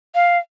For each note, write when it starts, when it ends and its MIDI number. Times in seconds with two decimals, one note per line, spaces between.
0.15 0.38 77